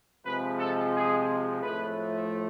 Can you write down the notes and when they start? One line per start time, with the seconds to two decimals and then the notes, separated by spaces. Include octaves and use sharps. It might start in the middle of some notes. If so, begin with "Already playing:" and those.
0.24 C3 F3 G#3 B4
0.58 A4
0.93 G#4
1.61 A2 F3 A3 B4